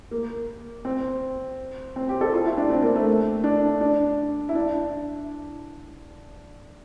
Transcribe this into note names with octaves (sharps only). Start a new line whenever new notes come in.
A#3
C4
C4
G4
A4
F4
E4
D4
C4
A#3
A3
D4
D4
E4
D4